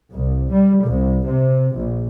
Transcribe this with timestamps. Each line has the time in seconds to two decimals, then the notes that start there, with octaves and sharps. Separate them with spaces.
0.12 C2
0.51 G3
0.84 C2
1.25 C3
1.73 A#1